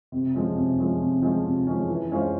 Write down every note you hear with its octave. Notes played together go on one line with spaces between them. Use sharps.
C3
F3 G#3 C#4
C3
F3 G#3 C#4
C3
F3 G#3 C#4
C3
F3 G#3 C#4
E3
G#3 C#4 F4 C5